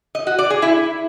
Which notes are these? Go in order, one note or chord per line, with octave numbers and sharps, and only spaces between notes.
D#5
F#4
D5
G#4
E4